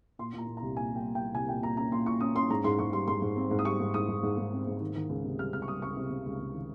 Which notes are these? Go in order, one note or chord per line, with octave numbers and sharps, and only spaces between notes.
A#2 C6
A#2
A#5
A#2
A#5
C2
A#2 G#5
G3 G5
G3
G5
G3
C2 G#5
A#2 G5
A#2 A#5
C#4 A#5
A#2 C6
A#2 C#6
C#4 D#6
C#4 C6
G#2 A#5
G#2 C6
G#2 C#6
G3 C6
G#2 C6
G#2
C4
G#2
D#6
G3 C#6
G#2
G#2 D#6
G#2
G#2
G#2
C4
G#2
D#3
D#3
C#2
C3
G3 F6
C#2 F6
C#6
G3 D#6
C#2 C#6
C3
C3
C#2
C#2
D#3